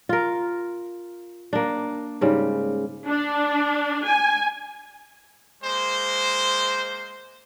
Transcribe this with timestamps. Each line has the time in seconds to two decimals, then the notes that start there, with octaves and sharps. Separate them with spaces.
0.09 F4 A#4
1.53 A#3 D4
2.21 G#2 C#3 G3
3.08 D4
4.07 G#5
5.63 G#3 A#3 C5